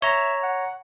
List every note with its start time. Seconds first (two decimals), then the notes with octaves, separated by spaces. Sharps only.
0.02 C#5 E5 A#5
0.43 F#5